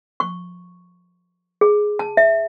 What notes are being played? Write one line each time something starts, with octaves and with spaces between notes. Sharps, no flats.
C#6
G#4
A5
E5